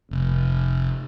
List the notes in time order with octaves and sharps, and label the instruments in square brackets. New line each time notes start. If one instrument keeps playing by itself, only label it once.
[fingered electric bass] F1